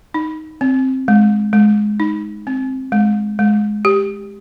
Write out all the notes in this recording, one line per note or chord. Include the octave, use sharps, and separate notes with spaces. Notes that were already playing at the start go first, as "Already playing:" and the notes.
D#4
C4
G#3
G#3
D#4
C4
G#3
G#3
G4